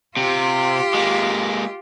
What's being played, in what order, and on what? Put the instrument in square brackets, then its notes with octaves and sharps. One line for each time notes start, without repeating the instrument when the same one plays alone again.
[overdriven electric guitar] C3 [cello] F4 G4
[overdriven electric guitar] G#3 A#3